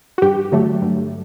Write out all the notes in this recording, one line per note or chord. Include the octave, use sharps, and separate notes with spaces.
F#4
G2 G4
D3 F#3 A3
G2